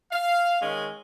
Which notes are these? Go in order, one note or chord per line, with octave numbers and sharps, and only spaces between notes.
F5
D#3 G#3 C#4